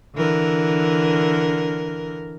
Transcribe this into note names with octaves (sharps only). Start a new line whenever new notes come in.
D3 E3 A#4